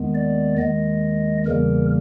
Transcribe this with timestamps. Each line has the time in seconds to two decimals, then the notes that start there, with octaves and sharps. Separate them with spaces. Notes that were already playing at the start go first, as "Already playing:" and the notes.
Already playing: D#2 D#3 G#3 B3
0.15 D5
0.58 D#2 D#3 G#3 D#5
1.46 E2 C#3 E3 G3 A#3 A#4